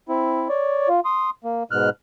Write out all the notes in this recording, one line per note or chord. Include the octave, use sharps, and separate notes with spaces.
C4 E4
C#5 D5
F4
C6 D#6
A#3
G#2 B2 F6 F#6